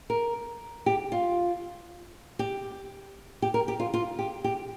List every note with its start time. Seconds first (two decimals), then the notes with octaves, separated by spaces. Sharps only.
0.10 A#4
0.86 G4
1.12 F4
2.39 G4
3.42 G4
3.54 A#4
3.68 G4
3.80 F4
3.94 F4
4.19 G4
4.44 G4